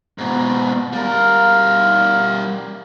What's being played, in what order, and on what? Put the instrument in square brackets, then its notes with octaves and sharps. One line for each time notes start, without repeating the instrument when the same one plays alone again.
[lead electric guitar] G#2 B2
[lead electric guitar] G3 A#4 [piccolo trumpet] F5